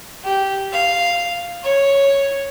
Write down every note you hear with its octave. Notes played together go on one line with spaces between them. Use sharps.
G4
F5
C#5